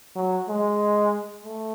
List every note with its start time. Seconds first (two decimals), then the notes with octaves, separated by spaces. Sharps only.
0.16 F#3
0.48 G#3
1.45 A3